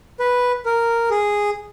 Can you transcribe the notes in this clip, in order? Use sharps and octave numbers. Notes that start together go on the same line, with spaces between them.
B4
A#4
G#4